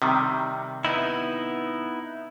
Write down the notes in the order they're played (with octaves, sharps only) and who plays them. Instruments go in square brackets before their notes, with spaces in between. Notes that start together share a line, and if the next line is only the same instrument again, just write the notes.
[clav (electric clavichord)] C3 D#3 G3
[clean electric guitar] B3 D#4 E4